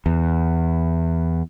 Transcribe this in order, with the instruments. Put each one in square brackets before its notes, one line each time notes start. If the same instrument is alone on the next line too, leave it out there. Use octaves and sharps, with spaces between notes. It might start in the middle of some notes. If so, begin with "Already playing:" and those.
[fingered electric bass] E2